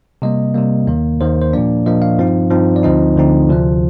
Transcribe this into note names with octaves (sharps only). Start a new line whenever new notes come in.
C3 G3 A#3 D#5
C3 G3 A#3
D#2 D#3 A#3
D#2 D#3 A#3 C5
C5
A#2 F3 A#3 D4 D5
A#2 F3 A#3 D4 D#5
F5
G2 F3 C4 D#4
G2 F3 C4 D#4
D5
D2 D3 F3 C4 D#4 D#5
D2 D3 F3 C4 D#4
D2 C3 F3 A3